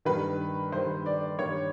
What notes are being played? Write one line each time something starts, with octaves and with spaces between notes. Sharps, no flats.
G2 D#3 B4
G2 D#3 C5
D5
G2 D#3 C#5